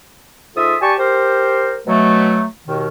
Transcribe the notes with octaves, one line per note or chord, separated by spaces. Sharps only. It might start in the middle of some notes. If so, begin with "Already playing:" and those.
G#2 F4 A4 E5 D#6
G4 D5 G#5 A5 C#6
G4 A#4 C5
B2 F#3 A3
D#2 B2 D#3